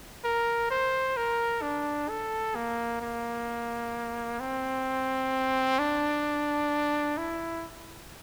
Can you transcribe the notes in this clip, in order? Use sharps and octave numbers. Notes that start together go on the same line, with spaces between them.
A#4
C5
A#4
D4
A4
A#3
A#3
C4
D4
E4